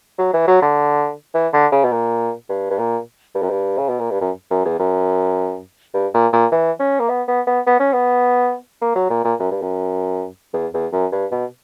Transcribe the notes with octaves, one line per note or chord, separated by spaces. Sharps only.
F#3
E3
F#3
D3
E3
D3
C#3
B2
A#2
G2
G2
A#2
G2
F#2
G2
C#3
B2
A#2
G2
F#2
F#2
E2
F#2
G2
A#2
A#2
E3
C#4
A#3
B3
B3
B3
B3
C#4
B3
A#3
F#3
A#2
A#2
F#2
G2
F#2
E2
E2
F#2
G2
B2